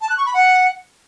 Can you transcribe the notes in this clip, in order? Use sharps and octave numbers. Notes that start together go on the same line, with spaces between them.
A5
F#6
C#6
B5
F#5